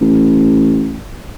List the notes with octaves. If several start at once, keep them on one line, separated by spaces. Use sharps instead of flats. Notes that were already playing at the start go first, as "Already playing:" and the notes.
A1